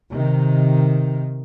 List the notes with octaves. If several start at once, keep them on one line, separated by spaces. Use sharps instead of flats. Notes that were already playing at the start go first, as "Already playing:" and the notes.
C3 D#3